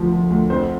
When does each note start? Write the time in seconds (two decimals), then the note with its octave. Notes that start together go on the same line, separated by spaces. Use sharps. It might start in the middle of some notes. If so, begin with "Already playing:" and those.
Already playing: D2 F3
0.12 F3
0.31 D2
0.50 F2 C5